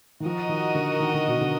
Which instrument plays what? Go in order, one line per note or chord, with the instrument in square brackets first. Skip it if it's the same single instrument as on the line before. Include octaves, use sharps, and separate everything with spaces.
[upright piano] D#3
[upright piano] F3 [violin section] F#4 A#4 D#5
[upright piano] D#3
D3
D#3
D3
B2
D3